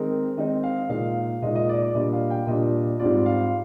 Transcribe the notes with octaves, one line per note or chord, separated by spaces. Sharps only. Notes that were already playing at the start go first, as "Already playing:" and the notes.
Already playing: D#3 G#3 C4 D#4 A#4
D#3 G#3 C4 D#4 D#5
F5
A#2 G#3 D#4 F5
A#2 G#3 D#4 D#5
D#5
D5
D5
A#2 G3 D4 D#5
F5
G5
A#2 G3 D4 D#5
G#2 G3 C4 F4 D5
F5